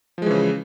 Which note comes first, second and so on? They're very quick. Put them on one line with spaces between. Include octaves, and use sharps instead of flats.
F3 G#3 E3 C#3